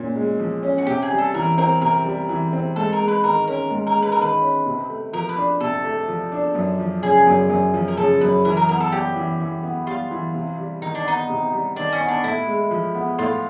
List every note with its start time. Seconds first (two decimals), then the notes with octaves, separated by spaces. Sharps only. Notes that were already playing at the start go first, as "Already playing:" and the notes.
Already playing: A#2 C#4
0.16 G#3
0.39 F3
0.63 C#4
0.78 F#4
0.87 C3 G4
1.02 G#4
1.11 G3
1.18 A4
1.34 E3 A#4
1.58 C4 A#4
1.81 C3 A#4
2.05 G3
2.29 E3
2.53 C4
2.76 G#2 A4
2.93 A#4
3.00 G#3
3.08 B4
3.24 D#3 A#4
3.48 C#4 A#4
3.70 G#2
3.87 A#4
3.95 G#3
4.02 B4
4.12 A#4
4.19 D#3 B4
4.42 C#4
4.66 C3
4.90 A3
5.13 F3 A#4
5.29 B4
5.37 D4
5.61 C3 A4
5.84 A3
6.08 F3
6.32 D4
6.55 F#2
6.79 F3
7.02 C#3 G#4
7.27 F#2
7.50 F#2
7.74 F3
7.88 A#4
7.97 C#3 A4
8.21 F#2 B4
8.45 E3 A#4
8.57 A#4
8.69 B3 A#4
8.80 A4
8.92 G3 G4
9.16 E3
9.40 E3
9.63 B3
9.87 G3 F4
10.11 E3
10.34 C3
10.58 G3
10.82 D#3 D#4
10.95 D4
11.05 B3 D#4
11.30 C3
11.53 G3
11.76 D#3 D4
11.92 C#4
12.00 B3
12.08 D4
12.24 A2 E4
12.47 G#3
12.71 F3
12.95 B3
13.19 A2 F4